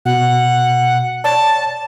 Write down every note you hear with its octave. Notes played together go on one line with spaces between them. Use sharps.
B2 F#5
C#5 D5 A5